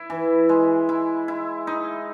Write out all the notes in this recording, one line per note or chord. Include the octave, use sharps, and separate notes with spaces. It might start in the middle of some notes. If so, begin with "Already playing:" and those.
Already playing: E4
E3
G#3
E4
E4
D#4